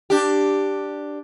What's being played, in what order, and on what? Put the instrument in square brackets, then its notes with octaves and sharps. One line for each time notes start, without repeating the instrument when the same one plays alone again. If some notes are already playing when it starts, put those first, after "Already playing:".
[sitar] D4 G4